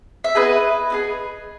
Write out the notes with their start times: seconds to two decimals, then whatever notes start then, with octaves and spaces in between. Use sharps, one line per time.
0.24 E5
0.35 B3 E4 G#4 B4 D#5
0.90 B3 E4 G#4